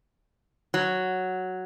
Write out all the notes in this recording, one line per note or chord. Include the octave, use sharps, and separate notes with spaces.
F#3